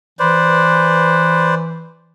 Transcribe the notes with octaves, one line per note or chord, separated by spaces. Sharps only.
E3 B4 C5 D5